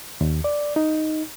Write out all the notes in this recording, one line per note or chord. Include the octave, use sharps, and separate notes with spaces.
D#2
D5
D#4